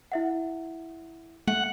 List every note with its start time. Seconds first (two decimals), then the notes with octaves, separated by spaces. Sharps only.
0.12 E4 E5 F#5
1.48 A3 F#5